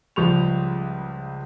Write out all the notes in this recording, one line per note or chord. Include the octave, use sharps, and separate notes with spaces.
C#2 F3 G3 C#6 F7